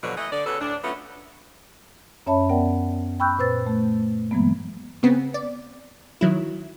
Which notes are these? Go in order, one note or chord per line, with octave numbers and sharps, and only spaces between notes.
G2 B2 D3 F3 F#3
E3 A3 D#5
D3 D5
C#3 B3 C#4 F#4 A4
D2 A2 D4
F#3 A3 B3 C#4 F4
F#2 C#4 C#5 E5 A5 B5
B3 A#4 D5 F#5 G5
G5 B5 C#6 E6 F#6 G6
A#2 B4 C5 E6 A6
A3
G2 E3 F#3 G#3 A#3 B3
C#3 B3 C4
D5
D#3 F#3 E4